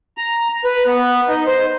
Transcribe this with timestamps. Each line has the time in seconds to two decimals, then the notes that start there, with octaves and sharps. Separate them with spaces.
0.17 A#5
0.64 B4
0.87 B3
1.28 D#4
1.47 C5